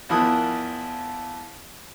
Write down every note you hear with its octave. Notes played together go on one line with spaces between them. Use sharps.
E2 F3 E4 A#4 D#6 F#6